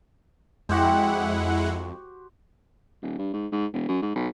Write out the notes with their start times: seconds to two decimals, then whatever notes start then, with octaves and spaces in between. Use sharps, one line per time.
0.69 F2 G#3 E4 F#4 G4 C5 F#5
3.03 D#1
3.19 G2
3.33 G#2
3.52 G#2
3.73 E1
3.88 F#2
4.02 G#2
4.15 B1